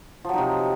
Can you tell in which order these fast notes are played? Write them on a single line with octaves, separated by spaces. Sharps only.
F3 F#3 D#4 C3